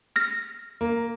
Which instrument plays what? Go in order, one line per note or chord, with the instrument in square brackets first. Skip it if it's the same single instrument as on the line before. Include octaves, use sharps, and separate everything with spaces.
[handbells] F6 A#6
[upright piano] A#3